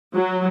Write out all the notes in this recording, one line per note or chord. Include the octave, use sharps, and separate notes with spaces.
F#3